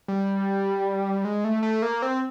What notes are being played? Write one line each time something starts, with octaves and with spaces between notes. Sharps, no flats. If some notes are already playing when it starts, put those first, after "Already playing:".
G3
G#3
A3
A3
A#3
C4